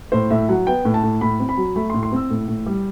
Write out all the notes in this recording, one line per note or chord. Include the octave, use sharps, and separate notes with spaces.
A2 C5
A2 E5
F#3 F#5
B3 G5
A2
A5
A2
A2 B5
C4
B5
F#3
A3 B5
C6
A2
C6
C4 E6
A2
A2
G3